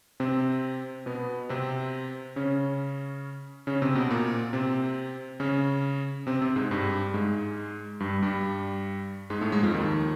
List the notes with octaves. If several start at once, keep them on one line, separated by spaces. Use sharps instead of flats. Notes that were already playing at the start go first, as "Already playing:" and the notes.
C3 C4
B2 B3
C3 C4
C#3 C#4
C#3 C#4
C3 C4
B2 B3
A#2 A#3
C3 C4
C#3 C#4
C3 C4
C3 C4
G#2 G#3
G2 G3
G#2 G#3
G2 G3
G2 G3
G#2 G#3
A2 A3
G#2 G#3
F2 F3
D#2 D#3